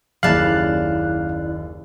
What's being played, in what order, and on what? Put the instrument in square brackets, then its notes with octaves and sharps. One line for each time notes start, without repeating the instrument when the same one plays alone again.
[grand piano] F#1 D#2 [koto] C#3 A5 [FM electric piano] E4 D5 F#6 [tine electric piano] F5